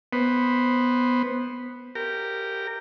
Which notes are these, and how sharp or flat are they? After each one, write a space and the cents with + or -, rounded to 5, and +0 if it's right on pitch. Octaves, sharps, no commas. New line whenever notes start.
B3 +0 C5 +5
G4 +0 A#4 -15